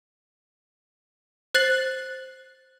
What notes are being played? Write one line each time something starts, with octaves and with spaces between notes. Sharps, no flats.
C5 F#6 A6 C7 F#7